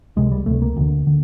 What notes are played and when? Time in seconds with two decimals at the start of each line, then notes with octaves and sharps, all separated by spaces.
0.16 C#2 C3 G#3
0.31 G3
0.46 C#2 C3 A3
0.62 A#3
0.77 D2 D3
1.07 D3